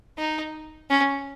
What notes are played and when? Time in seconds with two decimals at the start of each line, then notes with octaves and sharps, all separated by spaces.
0.18 D#4
0.90 C#4